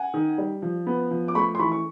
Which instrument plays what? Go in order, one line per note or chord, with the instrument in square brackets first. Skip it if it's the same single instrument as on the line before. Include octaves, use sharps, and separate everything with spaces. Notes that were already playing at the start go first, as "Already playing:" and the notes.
Already playing: [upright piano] F#5 G#5
D#3
G3
F3
B3
F3
D6
A3 B5 C#6
C6
E3 B5 C#6
C#6